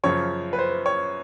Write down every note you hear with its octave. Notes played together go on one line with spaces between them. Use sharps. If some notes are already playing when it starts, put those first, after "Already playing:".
F#2 C#3 F3 C#5
B4
C5
C#5